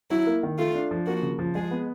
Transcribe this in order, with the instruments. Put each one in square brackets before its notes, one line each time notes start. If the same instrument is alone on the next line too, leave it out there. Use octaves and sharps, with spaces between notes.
[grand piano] F#3 [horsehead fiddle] E4
[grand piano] A#3
D#3
[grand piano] A3 [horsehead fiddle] F4
[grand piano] D4
F3
[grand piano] A#3 [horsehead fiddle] F#4
[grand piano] C#3
F3
[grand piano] G#3 [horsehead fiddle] G#4
[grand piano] B3